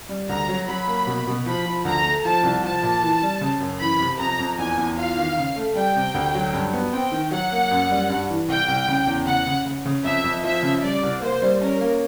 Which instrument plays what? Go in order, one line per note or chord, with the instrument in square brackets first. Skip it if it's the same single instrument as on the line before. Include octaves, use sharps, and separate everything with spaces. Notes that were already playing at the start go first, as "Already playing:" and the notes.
[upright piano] G3
[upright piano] D2 [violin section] A#5
[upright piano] F#3
[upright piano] F#3 [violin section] B5
[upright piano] A#3
B2
B2
[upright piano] F3 [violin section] B5
[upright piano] F3
[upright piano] D2 [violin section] A#5
[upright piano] A3
[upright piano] F3 [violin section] A5
[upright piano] C2
[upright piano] F3 [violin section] A5
[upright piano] A#2
E3
G3
C#3
F#2
[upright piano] E3 [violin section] B5
[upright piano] C3
[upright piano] F2 [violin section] A#5
[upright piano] F2
[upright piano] E2 [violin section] G#5
[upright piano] E2
[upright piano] F4 [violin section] F5
[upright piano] D#3
C#3
A3
[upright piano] G3 [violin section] G5
[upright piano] C3
D2
F#3
G2
B3
[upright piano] C4 [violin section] G5
[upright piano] D#3
[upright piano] F#3 [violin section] F#5
[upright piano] A#3
F#2
G3
G2
E3
[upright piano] C2 [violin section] G5
[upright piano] C2
C#3
E2
[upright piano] C#3 [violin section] F#5
[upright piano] C#3
C#3
C#3
[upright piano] F2 [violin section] E5
[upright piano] F2
[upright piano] F3 [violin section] E5
[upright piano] C#3
[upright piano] G3 [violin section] D5
[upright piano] C2
[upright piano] A#3 [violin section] C5
[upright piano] G3
[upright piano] C#4 [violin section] A#4
[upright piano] A#3